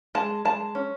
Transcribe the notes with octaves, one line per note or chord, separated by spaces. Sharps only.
G#3 A5
G#3 A5
C#4